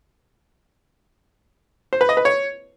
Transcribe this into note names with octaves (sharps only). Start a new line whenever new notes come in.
C5
B4
D#5
B4
C#5